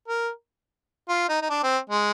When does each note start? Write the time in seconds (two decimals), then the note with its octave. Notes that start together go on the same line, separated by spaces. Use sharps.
0.08 A#4
1.09 F4
1.29 D#4
1.42 D#4
1.50 D4
1.63 C4
1.90 G#3